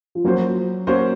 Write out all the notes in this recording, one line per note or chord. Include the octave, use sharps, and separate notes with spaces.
F3
F#3 A#3 C#4 F#4 C5
A#3 C#4 F#4 C5